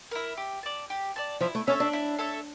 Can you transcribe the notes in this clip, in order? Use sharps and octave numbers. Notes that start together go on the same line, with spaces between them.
E4 A#4
G4
D5 A5
G4
D5 A5
F3 E4
A3
C#4 A4 C#5 E5
D4
E4
A4 C#5 E5